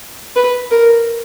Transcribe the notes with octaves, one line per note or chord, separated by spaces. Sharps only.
B4
A#4